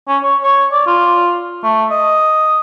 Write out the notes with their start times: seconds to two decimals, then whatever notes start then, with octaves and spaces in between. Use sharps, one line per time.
0.08 C#4
0.23 C#5
0.43 C#5
0.72 D5
0.87 F4
1.64 A3
1.91 D#5